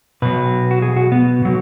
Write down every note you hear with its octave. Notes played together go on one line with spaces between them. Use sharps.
B2 F#3 B4
F#4
G#4
F#4
B3
B2 F#3